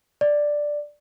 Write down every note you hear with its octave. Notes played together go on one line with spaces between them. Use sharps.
D5